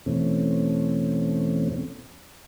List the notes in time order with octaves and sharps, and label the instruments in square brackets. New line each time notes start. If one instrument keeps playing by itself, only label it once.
[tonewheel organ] E2 B2 E3 A3 C4 C#4